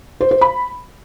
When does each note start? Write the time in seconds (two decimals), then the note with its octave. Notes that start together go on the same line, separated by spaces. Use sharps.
0.21 C5
0.31 C5
0.41 B5